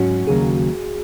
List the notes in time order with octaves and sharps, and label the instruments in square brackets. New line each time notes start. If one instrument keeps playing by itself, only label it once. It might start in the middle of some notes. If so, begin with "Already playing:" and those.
Already playing: [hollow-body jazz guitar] G#2 F#3 C#4 [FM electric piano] F#4
[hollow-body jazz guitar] D#2 C#3 F#3 A#3 [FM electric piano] G#4